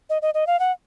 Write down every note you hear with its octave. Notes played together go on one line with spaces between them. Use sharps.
D#5
D#5
D#5
F5
F#5